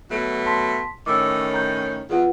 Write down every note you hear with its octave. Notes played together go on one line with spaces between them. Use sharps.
B2 F#3 A3
A5 C6 B6
A2 D#3 C#4 D6 E6
A#5 G6
E2 F4 B4 F#5